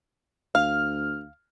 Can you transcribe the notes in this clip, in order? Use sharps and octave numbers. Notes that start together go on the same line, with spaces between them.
D2 F5 F6